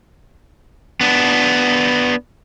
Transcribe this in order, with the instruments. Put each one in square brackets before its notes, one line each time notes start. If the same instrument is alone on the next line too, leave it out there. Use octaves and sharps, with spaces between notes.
[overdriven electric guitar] B3 D4